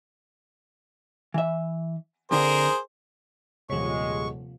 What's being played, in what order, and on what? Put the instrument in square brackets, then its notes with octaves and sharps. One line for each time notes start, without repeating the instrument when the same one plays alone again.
[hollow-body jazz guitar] E3 E5
[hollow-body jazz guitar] F2 D3 [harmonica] G#4 A#4 C5
[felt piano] D#1 C#5 [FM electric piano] C3 F3 [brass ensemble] G#3 [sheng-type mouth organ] C#6